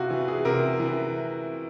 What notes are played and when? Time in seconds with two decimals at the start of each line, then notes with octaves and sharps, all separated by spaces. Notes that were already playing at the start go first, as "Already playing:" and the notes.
Already playing: C3 F4 F#4
0.11 E3
0.28 G#4
0.45 C3 A#4
0.80 E3